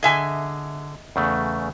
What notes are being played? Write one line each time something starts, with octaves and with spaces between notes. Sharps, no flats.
D3 G#4 D#5 E5 G#5
E2 C#3 A3